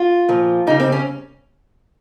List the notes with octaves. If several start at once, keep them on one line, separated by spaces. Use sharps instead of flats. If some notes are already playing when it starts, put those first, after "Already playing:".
Already playing: F4
A#2 F3
C#3 G3 D#4
C4
C#4